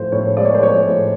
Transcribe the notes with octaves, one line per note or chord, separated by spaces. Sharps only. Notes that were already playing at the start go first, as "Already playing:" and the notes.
Already playing: A2 F3 G#3 C5
A2 C#5
G#3 D5
C#5
C5
F3 C#5
A2